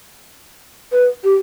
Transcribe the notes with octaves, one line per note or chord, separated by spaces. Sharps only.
B4
G4